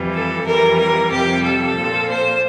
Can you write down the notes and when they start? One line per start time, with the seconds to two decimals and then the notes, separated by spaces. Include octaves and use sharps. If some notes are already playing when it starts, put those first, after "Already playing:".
Already playing: F2 E3 G3
0.13 A4
0.46 F2 E3 G3 A#4
0.78 A#4
1.11 F2 C3 G3 G4
1.43 A4
1.77 A#2 F3
2.09 C5